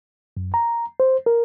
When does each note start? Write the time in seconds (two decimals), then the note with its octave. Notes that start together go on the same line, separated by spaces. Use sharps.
0.37 F#2
0.54 A#5
1.00 C5
1.26 A#4